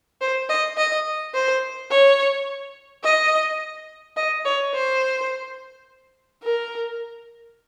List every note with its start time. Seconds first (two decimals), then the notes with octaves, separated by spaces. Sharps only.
0.21 C5
0.49 D#5
0.77 D#5
1.34 C5
1.91 C#5
3.04 D#5
4.17 D#5
4.45 C#5
4.74 C5
6.43 A#4